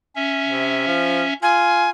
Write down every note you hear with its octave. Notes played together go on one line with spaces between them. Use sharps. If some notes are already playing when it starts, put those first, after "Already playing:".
C#4 E5
C3
F3
F4 G#5